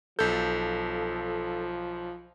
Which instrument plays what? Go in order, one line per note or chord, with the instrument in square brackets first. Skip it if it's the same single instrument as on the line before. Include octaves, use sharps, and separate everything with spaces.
[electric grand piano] B1 G6 [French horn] F3 [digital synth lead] A4